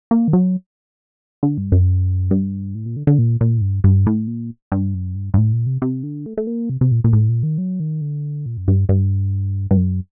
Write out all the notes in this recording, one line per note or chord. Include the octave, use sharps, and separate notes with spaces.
A#3
D#3
F#3
D3
G2
F#2
G2
A2
A#2
D3
D3
A#2
A#2
A2
G2
G2
A2
A#2
G2
F#2
G2
G2
A2
A#2
C3
C3
D3
A3
A3
A#3
C3
C3
A#2
A#2
A2
A#2
D#3
F#3
D#3
D3
A#2
F#2
G2
G2
G2
F#2